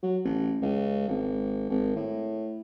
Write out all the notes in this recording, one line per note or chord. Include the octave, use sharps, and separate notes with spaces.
F#3
A1
C#2
G#1
G#1
A2